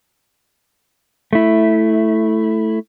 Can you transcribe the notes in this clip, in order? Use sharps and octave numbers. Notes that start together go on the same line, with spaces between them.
A3 E4